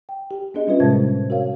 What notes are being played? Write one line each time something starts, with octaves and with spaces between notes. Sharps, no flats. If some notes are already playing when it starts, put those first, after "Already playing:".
G5
G4
B3 D4 G#4 D#5
G3 C#4 F4 B4 E5
A2 C3 G#3 C5 A5 G#6
F#4 A#4 C#5 F5